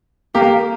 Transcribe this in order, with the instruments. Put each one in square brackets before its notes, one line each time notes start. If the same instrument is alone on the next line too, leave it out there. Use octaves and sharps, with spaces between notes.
[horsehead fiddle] A#3 [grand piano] G4